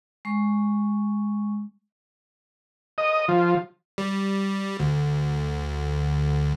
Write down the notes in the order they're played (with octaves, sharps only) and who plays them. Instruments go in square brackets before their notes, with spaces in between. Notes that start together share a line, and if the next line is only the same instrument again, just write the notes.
[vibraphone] G#3 C#6
[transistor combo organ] D#5
F3
[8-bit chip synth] G3
D2